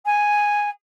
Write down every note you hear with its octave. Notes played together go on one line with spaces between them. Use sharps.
G#5